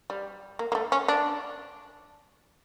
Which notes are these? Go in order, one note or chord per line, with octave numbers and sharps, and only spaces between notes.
G3
A#3
A#3
A3
C#4
D4